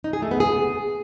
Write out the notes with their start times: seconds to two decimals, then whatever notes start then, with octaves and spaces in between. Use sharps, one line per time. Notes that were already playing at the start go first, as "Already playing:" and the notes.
0.04 D#4
0.13 G#4
0.22 A3
0.31 B3
0.40 G#4